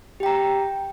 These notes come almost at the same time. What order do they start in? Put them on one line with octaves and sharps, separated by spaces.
G4 G5 A#5